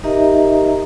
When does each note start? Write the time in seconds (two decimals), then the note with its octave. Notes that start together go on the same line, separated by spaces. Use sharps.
0.03 D#4 G4 A#4 D#5 E5 A#5